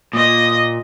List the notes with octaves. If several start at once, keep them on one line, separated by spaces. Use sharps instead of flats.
A#2 D#5